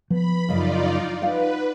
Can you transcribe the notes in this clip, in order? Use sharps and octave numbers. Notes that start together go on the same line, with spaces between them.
F3 B3 B5
F#2 C#3 D#4 F4 D5 D#5
D#4 B4 F5 F#5